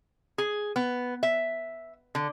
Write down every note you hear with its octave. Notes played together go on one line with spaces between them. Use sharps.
G#4
B3
E5
D3